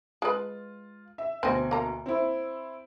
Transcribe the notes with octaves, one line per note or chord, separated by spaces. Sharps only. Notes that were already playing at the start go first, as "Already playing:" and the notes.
G#3 F4 B4
E5
D2 B2 C4 D#5 G#5
A#3 A#5
C4 E4